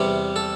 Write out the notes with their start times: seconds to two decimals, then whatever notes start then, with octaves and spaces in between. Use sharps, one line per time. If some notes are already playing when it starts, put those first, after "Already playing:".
Already playing: E2 C3 G3
0.36 A4